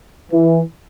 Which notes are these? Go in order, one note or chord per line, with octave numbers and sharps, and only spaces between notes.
E3